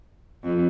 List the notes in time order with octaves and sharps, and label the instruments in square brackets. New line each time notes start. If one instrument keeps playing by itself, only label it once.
[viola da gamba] F2